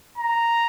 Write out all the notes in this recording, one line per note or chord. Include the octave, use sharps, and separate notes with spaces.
A#5